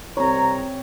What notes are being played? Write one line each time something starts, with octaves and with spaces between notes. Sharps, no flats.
C2 C4 C#5 A#5